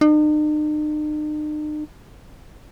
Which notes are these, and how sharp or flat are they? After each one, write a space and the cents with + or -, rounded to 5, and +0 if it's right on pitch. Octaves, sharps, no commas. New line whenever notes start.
D#4 -45